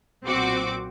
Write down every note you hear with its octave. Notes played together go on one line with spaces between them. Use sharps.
B1 A#2 C4 F#4 D6